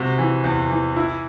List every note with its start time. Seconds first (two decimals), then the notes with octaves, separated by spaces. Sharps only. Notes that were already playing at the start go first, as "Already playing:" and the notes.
Already playing: C3 F#4
0.18 E3
0.44 E2
0.70 E3
0.96 E4